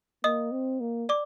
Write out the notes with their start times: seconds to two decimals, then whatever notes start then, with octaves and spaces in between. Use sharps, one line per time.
0.24 A#3 D#5 D#6
0.52 C4
0.80 A#3
1.09 D5 D6